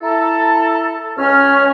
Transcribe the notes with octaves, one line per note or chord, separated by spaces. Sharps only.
E4 A4 A#5
C#2 C#4 F6